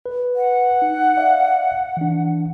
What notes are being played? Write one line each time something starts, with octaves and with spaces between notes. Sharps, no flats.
B4
F#5
D#4
D5 E5 F5
E3 D4